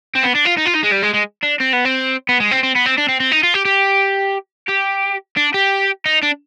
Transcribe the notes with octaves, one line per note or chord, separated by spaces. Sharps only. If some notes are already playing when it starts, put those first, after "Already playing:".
C4
B3
D4
F4
D#4
F4
D#4
G#3
G3
G#3
G#3
D4
C4
B3
C4
B3
G#3
C4
C4
B3
C4
D4
C4
C4
D#4
F4
G4
G4
G4
D4
G4
D#4
D4